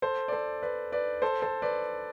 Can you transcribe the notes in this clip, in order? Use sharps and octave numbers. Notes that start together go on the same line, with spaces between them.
A4 C5
D5
A4 C5
B4 D5
B4 D5
A4 C5
A4 C5
B4 D5